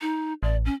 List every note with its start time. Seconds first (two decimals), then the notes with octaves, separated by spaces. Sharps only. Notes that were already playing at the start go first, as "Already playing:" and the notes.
0.01 D#4
0.43 A1 D5
0.65 C#4